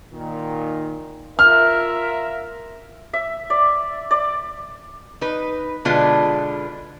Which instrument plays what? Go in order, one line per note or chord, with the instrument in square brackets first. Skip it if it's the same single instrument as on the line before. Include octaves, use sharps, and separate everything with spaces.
[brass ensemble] A#2 D#3
[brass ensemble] F4 A#4 E5 [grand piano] F6
[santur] E5
D5
D5
[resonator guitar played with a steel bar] D#4 B4
B2 D3 G#3 D4 F4 B4